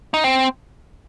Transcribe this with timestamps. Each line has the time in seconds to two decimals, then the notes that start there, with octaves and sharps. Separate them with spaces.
0.14 D#4
0.24 C4